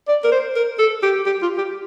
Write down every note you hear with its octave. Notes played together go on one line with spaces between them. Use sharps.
D5
A#4
C5
A#4
A4
G4
G4
F4
G4